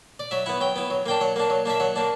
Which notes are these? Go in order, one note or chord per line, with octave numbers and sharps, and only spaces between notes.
D5
F#3 E5
B3 E4 F#5
F#3 G5
B3 E4
F#3
A#3 D4 G5
F#3 F#5
A#3 D4
F#3
A#3 D4 E5
F#3 F#5
A#3 D4